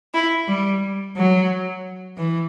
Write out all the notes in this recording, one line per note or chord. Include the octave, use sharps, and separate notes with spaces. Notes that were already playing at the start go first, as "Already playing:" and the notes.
E4
G3
F#3
E3